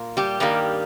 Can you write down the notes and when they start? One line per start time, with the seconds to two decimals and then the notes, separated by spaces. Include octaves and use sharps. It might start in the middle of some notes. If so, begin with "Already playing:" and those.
Already playing: A#2 A#3
0.17 G3 G4
0.40 G2 D#3 G3 A#3